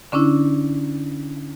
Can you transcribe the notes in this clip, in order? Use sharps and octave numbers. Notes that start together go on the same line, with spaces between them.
D3 C#4 D4 E4